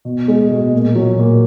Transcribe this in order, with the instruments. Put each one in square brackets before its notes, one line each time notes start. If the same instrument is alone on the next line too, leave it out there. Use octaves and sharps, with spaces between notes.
[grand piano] B2
G#3
B2
A#2
F#3
A#2